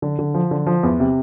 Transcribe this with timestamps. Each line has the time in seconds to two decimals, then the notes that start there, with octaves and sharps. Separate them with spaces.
0.02 D3
0.19 D3
0.34 F3
0.51 D3
0.67 F3
0.83 E2
1.00 C3